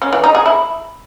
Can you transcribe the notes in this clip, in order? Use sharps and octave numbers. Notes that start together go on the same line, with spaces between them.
C#4
E3
D#4
G#4
E4